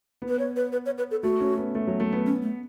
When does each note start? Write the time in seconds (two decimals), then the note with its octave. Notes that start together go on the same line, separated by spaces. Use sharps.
0.22 B3
0.29 B4
0.39 C#5
0.56 B4
0.72 B4
0.86 C#5
0.98 B4
1.11 A4
1.23 A3 F#4
1.41 C#4
1.58 B3
1.75 A3
1.87 F#3
2.00 A3
2.13 B3
2.26 C#4
2.42 A3